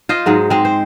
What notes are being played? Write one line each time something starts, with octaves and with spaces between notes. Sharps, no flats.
F4 C5 D#5
G#2 F#3 G#3
G#3 C4
C5